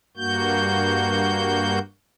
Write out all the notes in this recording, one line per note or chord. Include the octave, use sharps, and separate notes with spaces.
G2 A#3 F#4 G6